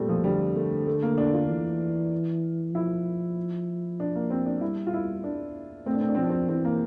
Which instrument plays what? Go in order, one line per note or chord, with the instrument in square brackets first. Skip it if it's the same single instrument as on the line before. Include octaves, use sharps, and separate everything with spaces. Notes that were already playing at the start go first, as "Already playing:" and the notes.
Already playing: [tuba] A#2 [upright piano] G3 A3 C4
[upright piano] F3
[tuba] D3 [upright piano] G3
[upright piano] A3
A3
A#3
D4
F4
[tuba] E3
[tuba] F3 [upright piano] E4
[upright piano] D4
A#3
C4
D4
[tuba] G3 [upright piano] E4
[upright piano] F4
E4
D4
[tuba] A3 [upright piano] C4
[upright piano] D4
C4
D4
C4
[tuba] F3
[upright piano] D4
C4
[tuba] E3 [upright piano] C4
[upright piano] A#3